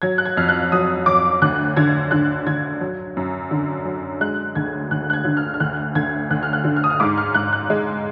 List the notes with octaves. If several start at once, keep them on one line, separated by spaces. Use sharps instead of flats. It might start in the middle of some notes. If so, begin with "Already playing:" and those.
F#3 G#6
F#6
G#6
F2 F6
F#6
F#3 D#6
F#3 D6
D2 F#6
D3 G#6
D3 F#6
D3 G#6
F#3
F#2
D3
F#3
G#3 F#6
D2 G#6
D2 F#6
F#6
G#6
D3
F6
F6
D2 F#6
D2 G#6
D2 F#6
F6
F#6
D3
F6
D#6
F6
G#2 D6
F6
G#2 F#6
F#6
G#3